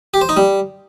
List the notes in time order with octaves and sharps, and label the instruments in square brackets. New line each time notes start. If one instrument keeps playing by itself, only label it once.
[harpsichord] G4
C5
D#4
G3